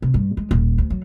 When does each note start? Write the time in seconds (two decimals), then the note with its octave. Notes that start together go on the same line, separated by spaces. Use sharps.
0.02 C3
0.14 G2
0.37 G#3
0.51 D#1
0.78 D2
0.90 F#3